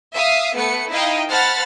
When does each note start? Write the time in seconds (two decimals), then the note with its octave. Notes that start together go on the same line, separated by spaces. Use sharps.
0.13 E5 F5 D#6
0.53 A3 B3 B4 C#7
0.90 D#4 E4 D#5 F5 G5
1.29 C5 F#5 A5 B5 F6 A6